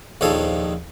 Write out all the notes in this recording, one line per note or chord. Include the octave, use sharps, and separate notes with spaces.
A#1 D#2 D#3 F3 A4 C#5